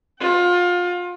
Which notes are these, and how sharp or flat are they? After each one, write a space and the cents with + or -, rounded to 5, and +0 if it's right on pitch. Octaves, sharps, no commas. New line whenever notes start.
F4 +25 F#5 +45